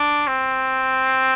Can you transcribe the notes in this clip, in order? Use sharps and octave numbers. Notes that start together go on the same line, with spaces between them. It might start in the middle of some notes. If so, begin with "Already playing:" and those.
Already playing: D4
C4